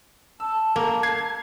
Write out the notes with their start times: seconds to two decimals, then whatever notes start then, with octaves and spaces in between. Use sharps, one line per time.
0.40 A5 E6
0.76 A#3
1.03 G#6 C7